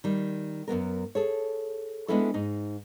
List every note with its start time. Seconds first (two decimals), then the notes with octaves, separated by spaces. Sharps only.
0.04 D#3 G3
0.68 F#2 A#2 B3 A#4
1.15 G#4 A4 C#5
2.08 G#3 B3 C#4 D4 E4 A4
2.34 G#2 D#4